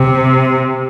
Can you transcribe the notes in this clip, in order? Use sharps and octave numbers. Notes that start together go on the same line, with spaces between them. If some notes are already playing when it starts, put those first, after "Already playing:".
Already playing: C3